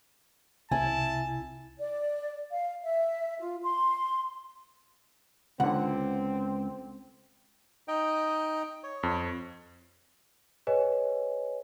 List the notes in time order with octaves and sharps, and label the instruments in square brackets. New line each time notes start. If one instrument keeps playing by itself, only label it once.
[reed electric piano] C2 C3 [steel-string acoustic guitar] E4 [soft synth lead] G#5 [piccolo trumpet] A5
[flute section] D5
F5
E5
F4
C6
[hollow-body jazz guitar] C#2 [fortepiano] D3 F#5 [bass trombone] C4
[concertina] D#4 D#5 G5
C#5
[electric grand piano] F2
[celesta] G#4 B4 C#5 D#5 G#5